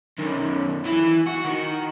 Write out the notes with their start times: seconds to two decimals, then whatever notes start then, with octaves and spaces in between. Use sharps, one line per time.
0.18 F#2 D#3
0.85 E3
1.26 F#4
1.45 D#3